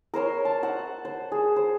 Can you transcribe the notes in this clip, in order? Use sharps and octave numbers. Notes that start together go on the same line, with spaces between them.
A#4 C5 C#5 C6
A5
C5 F#5
C5
G#4
C5